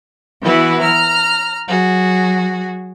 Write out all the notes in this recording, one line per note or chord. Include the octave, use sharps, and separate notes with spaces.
E3 B3 E4 F#4 B4
A#5 F6
F#3 F#4 G#4